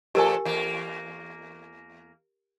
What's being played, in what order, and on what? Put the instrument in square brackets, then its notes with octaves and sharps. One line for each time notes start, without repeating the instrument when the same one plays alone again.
[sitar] A2 F3 A4 [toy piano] G4 A#4 G#5
[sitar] E2 A#3